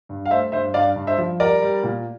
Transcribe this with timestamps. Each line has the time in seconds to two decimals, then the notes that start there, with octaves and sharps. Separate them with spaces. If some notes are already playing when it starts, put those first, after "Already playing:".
0.09 G2
0.26 F5
0.30 A3 C5 E5
0.52 G2 C5 E5
0.74 G2 D5 F5
0.96 G2
1.07 C5 E5
1.18 F3
1.40 G3 A#4 D5
1.62 G3
1.83 A#2